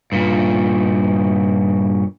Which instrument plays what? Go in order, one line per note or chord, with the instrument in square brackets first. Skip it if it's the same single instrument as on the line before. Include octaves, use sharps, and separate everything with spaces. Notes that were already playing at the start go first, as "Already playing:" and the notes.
[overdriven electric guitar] G2 A#2